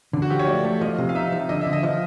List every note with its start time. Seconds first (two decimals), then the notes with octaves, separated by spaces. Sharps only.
0.13 D3
0.22 F#4
0.30 F3 G4
0.39 C#5
0.47 A3 D5
0.64 A3
0.81 F3 D#5
0.98 C3
1.09 F5
1.15 D#4 E5
1.32 F3
1.49 D3 D#5
1.61 D3 E5
1.73 D#5
1.83 F3